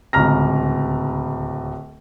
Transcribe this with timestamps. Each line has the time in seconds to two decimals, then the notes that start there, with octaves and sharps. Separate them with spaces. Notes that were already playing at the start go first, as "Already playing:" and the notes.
0.13 D1 C#2 A#5 F6 A#6